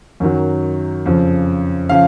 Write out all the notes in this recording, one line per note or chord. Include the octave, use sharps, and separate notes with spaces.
F#2 D#3 F#3
F2 C#3 F3
C#3 F3 F5